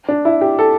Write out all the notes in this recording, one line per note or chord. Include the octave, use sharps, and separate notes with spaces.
D4
E4
G4
A4